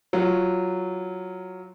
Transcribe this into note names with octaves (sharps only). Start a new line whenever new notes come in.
F#3 F4